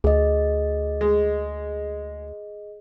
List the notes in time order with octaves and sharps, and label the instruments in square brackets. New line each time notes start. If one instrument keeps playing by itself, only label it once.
[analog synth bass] D2 [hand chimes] G#4 D#5
[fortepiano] G#3